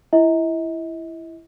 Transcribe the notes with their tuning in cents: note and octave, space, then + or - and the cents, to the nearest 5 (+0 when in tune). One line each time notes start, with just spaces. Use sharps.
E4 +15 D#5 +45